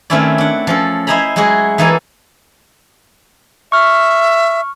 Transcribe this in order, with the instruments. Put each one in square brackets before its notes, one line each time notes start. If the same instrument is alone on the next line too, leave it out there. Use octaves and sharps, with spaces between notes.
[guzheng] D#3 A3 C4 C#4 E4 D5
D4 F#5
F3 C#4 A4
E4 C5 D#5 G#5 A#5 B5
F#3 G#3 E4 F#4 G#4
E3 A#3 D#4 A4 B4 G#5
[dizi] E5 [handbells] C#6 F6